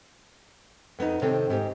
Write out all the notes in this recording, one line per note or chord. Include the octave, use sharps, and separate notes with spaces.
F2 B3 D4 D#4
C3 D#3 C4 A4 C#5
G#2 G4